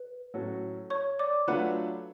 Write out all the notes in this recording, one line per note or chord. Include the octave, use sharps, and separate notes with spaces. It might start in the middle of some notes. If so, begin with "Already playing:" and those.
Already playing: B4
A2 F#3 C#4 F#4 A4
C#5 C#6
D5 D6
F#3 A3 D4 F4 B4 F#5 F#6